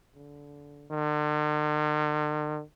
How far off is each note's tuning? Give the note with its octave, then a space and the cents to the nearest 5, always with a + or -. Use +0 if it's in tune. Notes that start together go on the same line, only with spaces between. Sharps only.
D3 -20
D3 +45